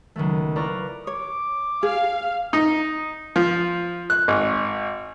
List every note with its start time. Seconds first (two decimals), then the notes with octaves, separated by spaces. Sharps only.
0.16 C#2 D#3 F#3 A3
0.56 E4 F4 B4 D5 A#5 C#6
1.07 C#5 D6
1.83 G#4 F5
2.53 D#4
3.36 F3
4.10 F#6
4.28 G#1